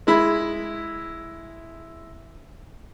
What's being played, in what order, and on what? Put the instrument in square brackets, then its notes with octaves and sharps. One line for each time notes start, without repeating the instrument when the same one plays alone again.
[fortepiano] G#3 E4 B5